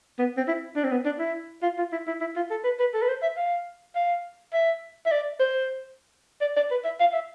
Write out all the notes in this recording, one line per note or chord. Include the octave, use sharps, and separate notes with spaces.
B3
C4
E4
D4
C4
B3
D4
E4
F4
F4
E4
E4
E4
F4
A4
B4
B4
A4
B4
C5
E5
F5
F5
E5
E5
D5
C5
D5
D5
B4
E5
F5
E5